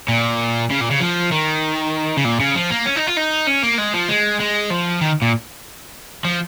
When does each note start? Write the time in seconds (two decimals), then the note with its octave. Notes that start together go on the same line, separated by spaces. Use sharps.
0.09 A#2
0.71 C#3
0.81 A#2
0.91 C#3
1.01 F3
1.32 D#3
2.17 C#3
2.25 A#2
2.40 C#3
2.55 F3
2.70 A#3
2.85 C#4
2.96 D#4
3.07 F4
3.17 D#4
3.47 C#4
3.63 A#3
3.78 G#3
3.94 F3
4.08 G#3
4.40 G#3
4.70 F3
5.01 D#3
5.22 A#2
6.25 F3